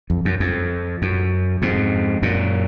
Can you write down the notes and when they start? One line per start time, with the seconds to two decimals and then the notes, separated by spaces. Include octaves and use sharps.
0.10 F2
0.25 F#2
0.40 F2
1.02 F#2
1.62 F2 G#2
2.22 F#2 A#2